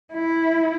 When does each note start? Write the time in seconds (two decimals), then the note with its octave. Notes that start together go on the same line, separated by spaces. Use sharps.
0.13 E4